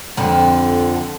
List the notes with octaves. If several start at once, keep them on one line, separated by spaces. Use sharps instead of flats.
F2 D3